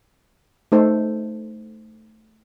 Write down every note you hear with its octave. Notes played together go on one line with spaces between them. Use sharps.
A3 D#4 A4 C5